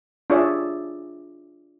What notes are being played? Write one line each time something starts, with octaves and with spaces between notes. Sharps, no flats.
D4 F4 G#4 C#5 D5 E5